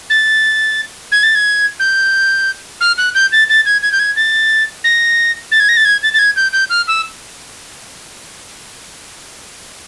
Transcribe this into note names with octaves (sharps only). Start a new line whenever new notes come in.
A6
G#6
A6
G#6
G6
F6
F#6
G6
A6
A6
G#6
G#6
G6
G#6
A6
A#6
A6
G#6
A#6
A6
G#6
A6
A6
G#6
G6
G6
F6
E6